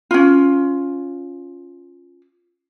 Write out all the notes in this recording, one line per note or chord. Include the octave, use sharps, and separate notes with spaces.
C#4 F4